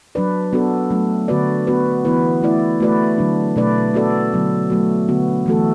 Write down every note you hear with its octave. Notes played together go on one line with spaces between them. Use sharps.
F#3 D4 B4 D5
B3 D4 F#4 A4
F#3 A3 D4
D3 B3 F#4 B4 D5
B3 F#4 B4
E3 B3 E4 B4
A3 E4 D5
A3 F#4 B4 D5
D3 F#3 D4
B2 A3 D4 B4 D5
B3 F#4 A4 D5
D3 F#3 B3
F#3 A3 F#4
D3 B3 F#4
E3 A3 F#4 A4